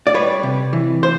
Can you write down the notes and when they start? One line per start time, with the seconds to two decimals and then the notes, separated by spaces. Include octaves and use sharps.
0.07 D5
0.14 G3 B4 C#5
0.43 C3
0.73 E3
1.03 C5